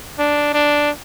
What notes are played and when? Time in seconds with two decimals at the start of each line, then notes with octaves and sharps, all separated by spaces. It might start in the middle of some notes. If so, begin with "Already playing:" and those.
0.19 D4
0.54 D4